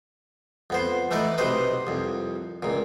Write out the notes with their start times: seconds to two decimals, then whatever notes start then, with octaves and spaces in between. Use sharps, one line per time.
0.70 F2 B3 C5
1.11 E3 A3 D#4 B4 D5
1.38 B1 C3 B4 C5 D#5
1.87 C2 F2
2.63 C#2 A#2